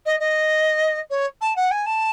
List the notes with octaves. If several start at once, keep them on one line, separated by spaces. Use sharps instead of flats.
D#5
D#5
C#5
A5
F#5
G#5
A5